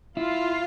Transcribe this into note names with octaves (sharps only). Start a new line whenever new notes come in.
E4 F4